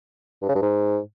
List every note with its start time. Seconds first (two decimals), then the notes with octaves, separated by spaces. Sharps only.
0.42 G2
0.48 C#3
0.55 G2
0.62 G#2